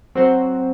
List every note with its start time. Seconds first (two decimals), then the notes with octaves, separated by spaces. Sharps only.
0.15 F#3 C4 F#4 C5